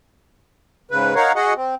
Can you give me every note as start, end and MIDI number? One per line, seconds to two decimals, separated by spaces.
0.91 1.14 44
0.91 1.14 49
0.91 1.14 71
1.15 1.32 63
1.15 1.32 70
1.15 1.32 73
1.15 1.32 77
1.15 1.32 78
1.36 1.54 66
1.36 1.54 68
1.36 1.54 75
1.36 1.54 78
1.56 1.75 60